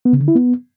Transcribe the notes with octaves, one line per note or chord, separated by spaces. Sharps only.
B3
C#3
D3
E4
B3